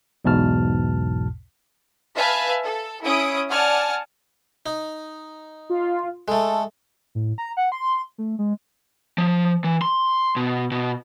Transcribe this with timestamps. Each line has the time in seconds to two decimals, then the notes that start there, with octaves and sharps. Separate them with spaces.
0.25 B1 E2 G#2 B2 A5 F6
2.16 B4 E5 F5 G#5 A5
2.64 A4
3.04 C#4 E4 D#6 D7
3.48 D5 F#5 G#5 A5 F6
4.66 D#4
5.70 F4
6.28 G#3 A3 A4
7.15 A2
7.38 A#5
7.57 F#5
7.72 C6
8.18 A3
8.39 G#3
9.18 F3
9.64 E3
9.82 C6
10.36 B2
10.71 B2